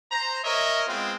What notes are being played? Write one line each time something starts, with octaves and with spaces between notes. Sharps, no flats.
C5 A#5
A#4 C#5 D#5 E5
G#3 B3 C4 F4